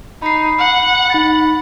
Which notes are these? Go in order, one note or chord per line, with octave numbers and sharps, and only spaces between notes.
D#4 B5 C7
F#5
D#4 B5 A6